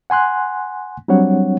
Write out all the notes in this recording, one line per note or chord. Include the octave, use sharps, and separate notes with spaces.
F#5 G#5 C6 F#6
F#3 G3 C4 D4 C#5 F#5